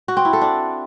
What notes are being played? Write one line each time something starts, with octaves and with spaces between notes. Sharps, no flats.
F#4
C4
E4
A4
D4